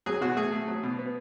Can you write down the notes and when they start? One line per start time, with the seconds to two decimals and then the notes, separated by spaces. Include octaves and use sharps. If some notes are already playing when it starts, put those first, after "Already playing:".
0.06 F#3 G#4
0.21 B2 F#4
0.36 A3 G#4
0.52 A3
0.68 F#3
0.83 B2
0.99 B3